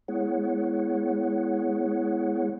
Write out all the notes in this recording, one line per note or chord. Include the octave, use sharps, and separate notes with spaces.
G#3 B3 E4 G#4 C#5 F#5